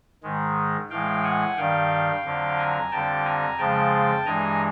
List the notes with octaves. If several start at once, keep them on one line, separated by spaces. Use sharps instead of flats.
G#2 D#3 G#3
A2 E3 G#3 F5 G5
F#5 G#5
G2 D#3 G3 F5 G5
F2 D3 F#3
G#5 A#5
F2 D3 G3 G5 A5
G#5 A#5
F2 C#3 F3 G#3 G5 A5
G2 E3 G#3 G#5 A#5